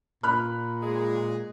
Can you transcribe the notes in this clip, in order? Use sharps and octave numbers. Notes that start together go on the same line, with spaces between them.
A#2 B5 F6 F#6
G#3 G#4